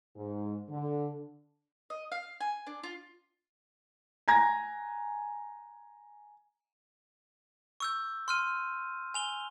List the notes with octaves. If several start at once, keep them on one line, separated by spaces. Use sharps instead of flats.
G#2
D3
D#5
F5
G#5
D4
F4
G#5 A#5 G#6 A#6
C#6 E6 G6
C6 F6 D#7
G#5 F7 G7